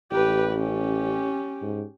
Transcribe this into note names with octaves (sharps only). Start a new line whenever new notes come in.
A1 G4 B4
C#4 G4
G#2